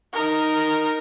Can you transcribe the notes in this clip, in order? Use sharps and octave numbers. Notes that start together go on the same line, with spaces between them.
D#4 A#4